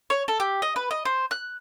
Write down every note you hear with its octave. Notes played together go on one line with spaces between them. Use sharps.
C#5
A4
G4
D#5
B4
D#5
C5
F#6